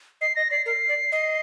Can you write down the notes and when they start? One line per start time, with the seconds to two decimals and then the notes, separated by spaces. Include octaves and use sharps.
0.21 D#5 C7
0.36 D#5 A#6
0.51 D5 C7
0.66 A#4 C7
0.89 D5
1.12 D#5